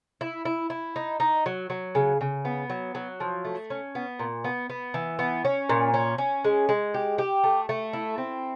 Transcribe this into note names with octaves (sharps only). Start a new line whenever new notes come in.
E4
E4
E4
D#4
D#4
F#3
F#3
C#3
C#3
B3
F#3
F#3
F3
A3
C#4
B3
A#2
B3
B3
E3
B3
C#4
A#2
C#4
C#4
G#3
G#3
G4
G4
A3
A3
E4
C4